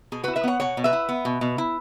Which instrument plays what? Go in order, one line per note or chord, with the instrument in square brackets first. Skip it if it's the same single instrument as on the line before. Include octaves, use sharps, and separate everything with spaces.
[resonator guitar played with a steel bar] B2 G#4
F#4 B4
E4
B4 E5
B3 C#5 F#5
B2 C#5 F#5
B2
B4 E5
E4
B3
B2
B2
E4